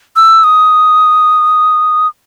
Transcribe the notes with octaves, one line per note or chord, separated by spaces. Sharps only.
E6
D#6